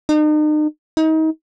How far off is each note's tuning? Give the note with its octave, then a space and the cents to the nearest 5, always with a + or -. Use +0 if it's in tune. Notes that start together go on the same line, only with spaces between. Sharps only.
D#4 -40
D#4 +30